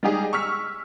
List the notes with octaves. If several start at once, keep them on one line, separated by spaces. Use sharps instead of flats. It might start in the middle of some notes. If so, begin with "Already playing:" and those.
G3 G#3 D#4 G4 G#4
C#6 E6 F6 B6